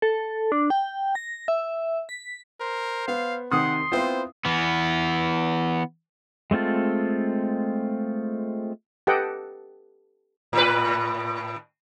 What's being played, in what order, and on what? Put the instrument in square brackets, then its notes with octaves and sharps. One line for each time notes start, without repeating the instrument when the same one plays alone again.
[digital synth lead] A4
D4
G5
A#6
E5
B6
[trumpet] A#4 [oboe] C5
[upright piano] B3 [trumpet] F5
[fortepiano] C3 D#3 [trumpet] F#5 [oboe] C6 [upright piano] D#6
[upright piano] B3 C4 [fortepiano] E4 F4 [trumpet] C5
[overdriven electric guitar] E3 B3
[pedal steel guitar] G#3 A3 C4 F4 A4
[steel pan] G4 A4 B4 D#5 F#5 G5
[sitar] A2 B4